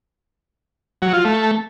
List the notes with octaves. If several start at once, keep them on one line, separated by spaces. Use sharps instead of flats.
F#3
F4
A3